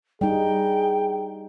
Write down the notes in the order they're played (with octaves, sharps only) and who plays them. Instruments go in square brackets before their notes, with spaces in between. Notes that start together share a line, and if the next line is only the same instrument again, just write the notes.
[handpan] G3 D#4 [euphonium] G#4 [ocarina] G5